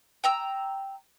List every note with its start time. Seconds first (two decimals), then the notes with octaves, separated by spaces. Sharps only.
0.24 G5 A#5 E6